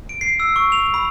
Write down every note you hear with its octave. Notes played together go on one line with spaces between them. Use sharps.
D7
C7
E6
C#6
F7
B5